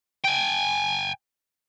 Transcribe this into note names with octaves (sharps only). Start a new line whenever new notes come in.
G5 G#5